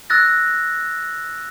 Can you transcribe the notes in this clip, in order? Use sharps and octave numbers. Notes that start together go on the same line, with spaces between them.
E6 F#6 A6 A#6